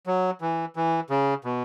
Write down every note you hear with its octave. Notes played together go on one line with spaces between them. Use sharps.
F#3
E3
E3
C#3
B2